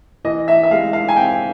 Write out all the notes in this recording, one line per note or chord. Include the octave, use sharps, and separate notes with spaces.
E3 D#5
E5
E5
G#3 F5
F5
G#5
C4 G5